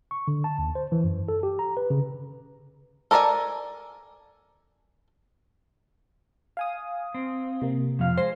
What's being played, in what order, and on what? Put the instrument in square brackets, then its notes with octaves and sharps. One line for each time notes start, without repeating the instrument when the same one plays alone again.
[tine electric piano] C#6
D3
A5
D#2
C5
E3
F#2
A4
G4
A#5
B4
C#3
[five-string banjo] A4 A#4 D5 D#5 G#5
[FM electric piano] F5 G#5 D#6
[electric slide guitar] C4
[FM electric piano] C3 A#3
[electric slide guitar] F2 F3 F5
[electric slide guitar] G#3 [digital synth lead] C5